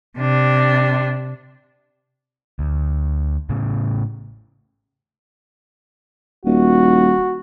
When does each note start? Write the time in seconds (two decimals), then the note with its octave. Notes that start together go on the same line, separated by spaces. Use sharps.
0.18 C3 D4
2.59 D2
3.49 A2 C#3
6.45 D#1 F#4